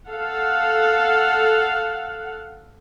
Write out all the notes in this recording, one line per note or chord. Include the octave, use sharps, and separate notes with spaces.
A4 F5 F#5